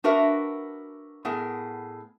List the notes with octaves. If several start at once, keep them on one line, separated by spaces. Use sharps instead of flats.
D4 F#4 A#4 B4 E5
A2 B3 G#4 A#4